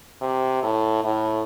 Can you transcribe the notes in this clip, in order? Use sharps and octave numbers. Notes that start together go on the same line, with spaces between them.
C3
A2
A2